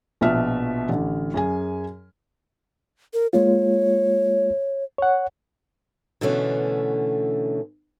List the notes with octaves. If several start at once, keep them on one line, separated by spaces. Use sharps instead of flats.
A#1 B2 F3 E5 F6
A1 D3
F#2 G#4 G#5
A#4
G#3 A#3 F4 C#5
C#5 F#5
B2 D3 E3 A3 C#4